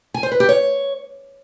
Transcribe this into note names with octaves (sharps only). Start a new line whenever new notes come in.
G#5
C5
B4
G4
C#5